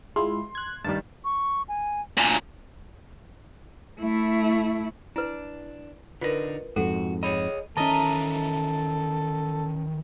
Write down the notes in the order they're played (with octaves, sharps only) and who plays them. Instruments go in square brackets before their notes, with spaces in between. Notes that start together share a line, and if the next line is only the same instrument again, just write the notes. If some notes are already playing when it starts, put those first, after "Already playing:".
[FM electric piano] G#3 E4 F4 [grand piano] C6
[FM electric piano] F#6 G#6
[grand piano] G2 D#3 G3 [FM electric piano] A5
[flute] C#6
G#5
[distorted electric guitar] D2 A#2 [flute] G#5
[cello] A3 E4
[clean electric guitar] D4 [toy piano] E4 B4
[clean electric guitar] D3 D4 D#4 [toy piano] F4 [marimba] A#4 B4
[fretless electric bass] F2 G#2 [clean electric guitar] F#4 [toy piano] A4 F#5
[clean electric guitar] G#4 C#5 D#5 [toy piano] B5
[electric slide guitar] D#3 E3 E5 [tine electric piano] C#4 A5 [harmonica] A4 [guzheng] A#4 D#5